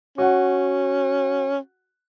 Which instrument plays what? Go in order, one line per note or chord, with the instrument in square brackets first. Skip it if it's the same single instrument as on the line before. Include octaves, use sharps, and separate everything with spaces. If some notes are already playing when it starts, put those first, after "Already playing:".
[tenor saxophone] C#4 [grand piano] F#4 F#5